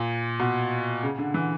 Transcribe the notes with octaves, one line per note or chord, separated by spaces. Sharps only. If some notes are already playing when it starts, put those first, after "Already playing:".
Already playing: A#2
B2
C#3
D3
E3